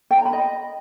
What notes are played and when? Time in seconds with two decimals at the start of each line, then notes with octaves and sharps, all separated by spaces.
0.11 G5
0.18 A#5
0.25 B5
0.33 D#5